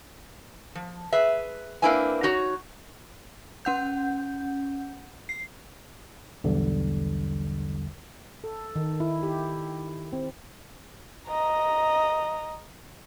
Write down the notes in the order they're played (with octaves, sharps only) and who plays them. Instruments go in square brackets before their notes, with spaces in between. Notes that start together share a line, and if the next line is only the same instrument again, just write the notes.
[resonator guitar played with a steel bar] F3
G#4 B4 E5
A#3 C4 D4 E4 B4 G#5
D#4 F#4 C#5
[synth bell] C#4 F#5 G6
C7
[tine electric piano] B1 E2 D3 G3
[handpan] A4
D#3
E4
G4
C4
[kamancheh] D#5 A#5